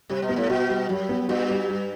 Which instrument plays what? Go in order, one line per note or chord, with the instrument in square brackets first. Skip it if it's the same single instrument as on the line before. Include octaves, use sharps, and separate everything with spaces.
[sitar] C3 [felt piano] G3
[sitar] B2
[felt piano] B3
[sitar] A2
[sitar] B2 [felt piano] F#4
[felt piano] G3
[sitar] F#2 [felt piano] G3
[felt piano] B3
[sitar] G2 [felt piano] F#4
[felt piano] G3
G3